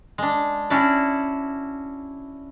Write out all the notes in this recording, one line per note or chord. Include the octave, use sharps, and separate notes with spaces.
G#3 D4
C#4 D4 E4 F#4 D5